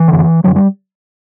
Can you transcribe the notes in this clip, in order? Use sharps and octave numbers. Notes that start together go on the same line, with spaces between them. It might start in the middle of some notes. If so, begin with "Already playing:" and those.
Already playing: E3
F#2 D3
F#2 D3 F#3
G3